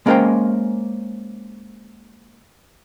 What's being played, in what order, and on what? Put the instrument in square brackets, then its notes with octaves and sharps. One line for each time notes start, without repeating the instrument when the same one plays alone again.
[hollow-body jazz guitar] G#3 A#3 C#4 A#4 C5 G5